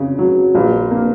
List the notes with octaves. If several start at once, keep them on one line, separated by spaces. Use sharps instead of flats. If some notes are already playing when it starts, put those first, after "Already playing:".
Already playing: F2 C#3
F#3
A#1
A#3